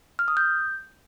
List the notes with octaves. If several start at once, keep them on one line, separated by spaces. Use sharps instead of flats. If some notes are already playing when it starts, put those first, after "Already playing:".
F6
D#6
G6